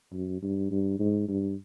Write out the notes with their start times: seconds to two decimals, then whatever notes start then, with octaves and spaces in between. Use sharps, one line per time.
0.13 F#2
0.42 G2
0.71 G2
0.99 G#2
1.28 G2